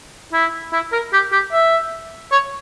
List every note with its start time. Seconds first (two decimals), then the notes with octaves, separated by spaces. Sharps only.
0.33 E4
0.73 E4
0.92 A#4
1.13 G4
1.32 G4
1.52 E5
2.32 C#5